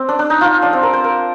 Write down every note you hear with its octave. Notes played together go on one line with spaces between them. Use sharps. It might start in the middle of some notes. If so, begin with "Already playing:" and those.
Already playing: C4
D4
D4
D#4
F4
D4
C4
A#4
C5
A#4